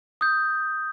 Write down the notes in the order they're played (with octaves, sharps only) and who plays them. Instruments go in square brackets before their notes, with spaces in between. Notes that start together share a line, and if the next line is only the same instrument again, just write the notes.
[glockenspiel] D#6 G6